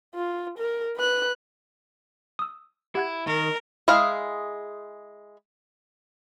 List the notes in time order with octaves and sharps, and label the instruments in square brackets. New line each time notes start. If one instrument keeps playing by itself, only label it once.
[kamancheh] F4
A#4
B4 F#6
[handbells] D#6 E6
[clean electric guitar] E4 [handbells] G4 F#5 G#6
[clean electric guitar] D#3 [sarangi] A#4
[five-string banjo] G#3 E4 G#4 F5